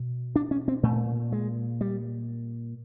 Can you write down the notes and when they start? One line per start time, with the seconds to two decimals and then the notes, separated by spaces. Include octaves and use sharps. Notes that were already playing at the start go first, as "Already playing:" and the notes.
Already playing: B2
0.36 D4
0.51 C#4
0.68 C4
0.83 A#2 A3
1.32 G#3
1.81 G3